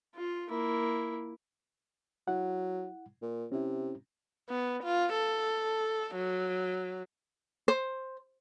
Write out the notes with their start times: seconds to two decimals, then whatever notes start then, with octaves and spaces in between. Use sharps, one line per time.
0.15 F4
0.49 A#3 E4
2.28 F#3 E4 F#5
3.22 A#2
3.52 C3 C#4 E4
4.49 B3
4.84 F4
5.13 A4
6.15 F#3
7.68 C5